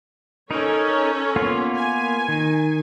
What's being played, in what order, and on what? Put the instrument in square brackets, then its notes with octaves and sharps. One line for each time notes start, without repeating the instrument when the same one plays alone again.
[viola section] C#4 A4 C#5 [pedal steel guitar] D#4 A#4
[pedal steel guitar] A#3 B3 F4
[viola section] G#5
[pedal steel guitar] D#3